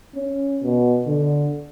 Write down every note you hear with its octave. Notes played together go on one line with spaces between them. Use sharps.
C#4
B2
D3